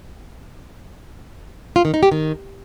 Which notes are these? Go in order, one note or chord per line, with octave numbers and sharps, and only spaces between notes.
F4
D#3
D#4
G4
D#3